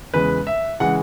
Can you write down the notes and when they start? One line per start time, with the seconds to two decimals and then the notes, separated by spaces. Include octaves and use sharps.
0.14 E2 C#3 E3 G#3 B4
0.47 E5
0.80 C#3 E3 G#3 F#5